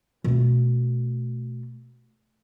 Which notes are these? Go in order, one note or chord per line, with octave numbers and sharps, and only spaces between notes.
B2 A3